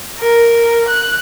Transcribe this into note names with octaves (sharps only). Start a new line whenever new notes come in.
A#4
F#6